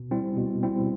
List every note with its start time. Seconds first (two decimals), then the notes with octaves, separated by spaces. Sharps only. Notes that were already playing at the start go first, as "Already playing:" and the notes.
Already playing: B2
0.11 G3 C4 E4
0.37 B2
0.63 G3 C4 E4